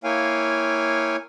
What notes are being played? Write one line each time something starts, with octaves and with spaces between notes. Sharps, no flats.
A#3 E4 C#5 F5 G5 G#5